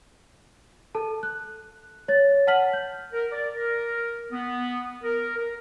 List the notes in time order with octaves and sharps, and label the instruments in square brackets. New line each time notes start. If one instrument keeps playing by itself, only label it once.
[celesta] A4 A5
F#6
C#5 A6
F#5 A5 F6 B6 F#7
G6
[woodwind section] A#4
D5
A#4
B3
A#4
A#4